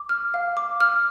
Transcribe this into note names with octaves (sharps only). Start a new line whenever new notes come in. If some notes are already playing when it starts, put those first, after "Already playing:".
Already playing: D6
F6
F5
D6
F6